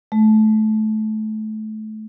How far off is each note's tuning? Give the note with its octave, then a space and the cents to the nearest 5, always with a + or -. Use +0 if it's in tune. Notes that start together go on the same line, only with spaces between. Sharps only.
A3 -25